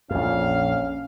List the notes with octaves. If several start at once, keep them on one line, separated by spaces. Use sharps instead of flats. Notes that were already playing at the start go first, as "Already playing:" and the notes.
A#1 F2 C#4 F5